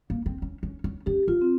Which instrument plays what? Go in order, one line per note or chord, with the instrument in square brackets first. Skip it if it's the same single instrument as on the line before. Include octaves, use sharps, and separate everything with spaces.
[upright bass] A#3
C4
C#4
C#4
C#4
[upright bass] C#4 [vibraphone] G4
[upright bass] E4 [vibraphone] F4
[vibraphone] C4